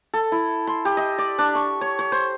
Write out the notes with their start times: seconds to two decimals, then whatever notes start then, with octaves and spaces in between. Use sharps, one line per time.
0.14 A4
0.32 E4
0.67 C6
0.85 G4
0.97 D#5
1.18 D5
1.39 D4
1.55 C#6
1.81 C#5
1.99 C#5
2.12 C5